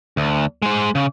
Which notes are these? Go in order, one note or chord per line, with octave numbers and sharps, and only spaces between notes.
D2
G#3 C5
C#3